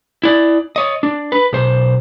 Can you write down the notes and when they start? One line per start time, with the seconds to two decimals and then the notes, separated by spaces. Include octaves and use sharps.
0.23 E4 D5
0.76 C#5 D#5
1.03 D4
1.32 B4
1.53 B1 C5